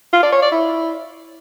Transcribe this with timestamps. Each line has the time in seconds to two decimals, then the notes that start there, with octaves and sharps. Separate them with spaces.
0.13 F4
0.23 D5
0.32 C#5
0.42 D5
0.52 E4